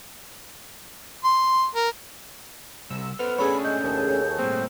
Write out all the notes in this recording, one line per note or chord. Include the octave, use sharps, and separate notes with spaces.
C6
A#4
C3 G3 E6
B3 A4 C5 F6
A3 C#4 D4 G#4 A4 C#5 B5
G#3 G6
D#2
A2 G3 A#3 C4